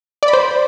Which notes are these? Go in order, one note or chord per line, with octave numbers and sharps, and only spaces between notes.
D5
B5
C5